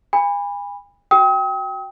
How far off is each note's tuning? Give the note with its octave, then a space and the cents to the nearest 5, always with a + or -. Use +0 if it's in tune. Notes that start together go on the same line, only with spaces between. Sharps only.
G#5 -40 B5 +0
F#4 +0 G5 +0 D#6 +40